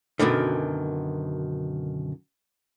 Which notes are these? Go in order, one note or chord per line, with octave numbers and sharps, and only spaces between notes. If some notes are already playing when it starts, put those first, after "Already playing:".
F#2 B2 D3 D#3